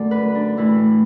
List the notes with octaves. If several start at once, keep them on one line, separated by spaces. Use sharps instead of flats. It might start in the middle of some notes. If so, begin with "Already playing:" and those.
Already playing: F#2 D3 A3 A4 D5
B4
D4
A2 E3 A3 E4